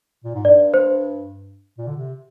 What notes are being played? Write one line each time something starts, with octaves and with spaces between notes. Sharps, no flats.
A#2
G#2
G2 D5
C5
A#2
D3
C3